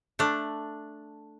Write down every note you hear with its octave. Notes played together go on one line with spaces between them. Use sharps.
A3 D4